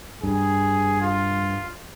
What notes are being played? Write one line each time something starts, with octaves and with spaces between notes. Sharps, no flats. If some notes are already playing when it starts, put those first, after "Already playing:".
G2 G#4
F4